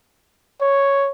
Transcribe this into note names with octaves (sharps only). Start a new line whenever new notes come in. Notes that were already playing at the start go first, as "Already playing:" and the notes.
C#5